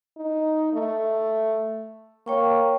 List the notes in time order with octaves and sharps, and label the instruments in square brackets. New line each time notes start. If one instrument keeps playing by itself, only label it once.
[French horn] D#4
A3
[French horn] A#3 [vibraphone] C#5 G5 C#6